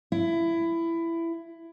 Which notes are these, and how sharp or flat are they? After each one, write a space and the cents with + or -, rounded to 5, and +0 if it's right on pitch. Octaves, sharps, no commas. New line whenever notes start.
E4 +15